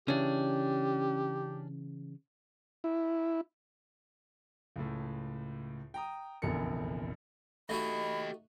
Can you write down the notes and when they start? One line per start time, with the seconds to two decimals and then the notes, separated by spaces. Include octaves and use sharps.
0.08 C#3 E3 C#4 D4 G4
2.84 E4
4.76 C#2 A2
5.94 G5 A#5 D#6
6.42 F1 A#1 E2 D3 A#4 C#7
7.70 A3 D#4 F#4 G4 D#5 B5